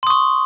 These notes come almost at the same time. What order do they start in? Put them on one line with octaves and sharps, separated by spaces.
C6 D#6 C#6